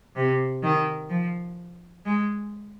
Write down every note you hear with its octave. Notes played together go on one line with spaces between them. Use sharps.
C3
D#3
F3
G#3